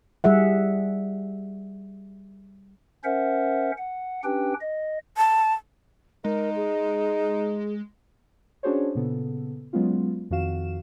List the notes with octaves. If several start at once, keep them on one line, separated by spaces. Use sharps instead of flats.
G3 G#4 E5 F#5
C#4 A#4 C5 E5 F#5
F#5
C#4 D4 G4 B4 G5
D#5
A5
G#3 D#4 A#4
G#4
C#4 D4 F#4 G#4 C5 C#5
A#2 C#3 B3 A4
F#3 G#3 B3 C#4 F4
F2 D#3 F#4 F5 E7